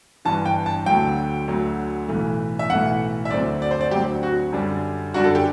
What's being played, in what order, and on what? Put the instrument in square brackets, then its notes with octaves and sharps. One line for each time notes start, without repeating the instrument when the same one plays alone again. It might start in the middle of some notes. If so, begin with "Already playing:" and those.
[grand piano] G1 G2 E3 A5
G5
A5
D2 D3 F#3 G5
D2 D3 F#3
B1 A2 E3 A3
E5
B1 A2 E3 A3 F#5
E5
D2 D3 F#3 C4 D5
D5
C5
D5
D2 D3 F#3 C4 G4
F#4
F#2 D3 G3 D4
F#2 D3 G3 D4 F#4
A4
G4